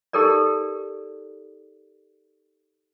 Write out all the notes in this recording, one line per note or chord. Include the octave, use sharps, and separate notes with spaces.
D#4 G4 A4 A#4 D5